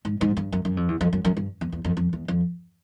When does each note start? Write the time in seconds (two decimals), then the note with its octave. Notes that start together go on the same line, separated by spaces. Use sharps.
0.05 G#2
0.21 G#2
0.37 G2
0.52 F#2
0.65 F#2
0.77 F2
0.88 E2
1.01 F2
1.13 F#2
1.25 F#2
1.37 G2
1.61 E2
1.72 E2
1.84 F2
1.97 F2
2.13 E2
2.28 F2